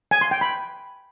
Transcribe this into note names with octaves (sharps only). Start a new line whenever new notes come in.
G#5
C6
G5
B5